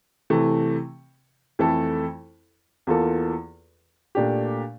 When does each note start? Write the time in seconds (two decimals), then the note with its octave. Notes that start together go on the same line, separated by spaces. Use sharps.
0.30 C3 E3 A3
1.59 F2 E3 A3 E4 A4
2.87 E2 E3 A#3 F4 A4
4.15 A#2 A3 D4 G4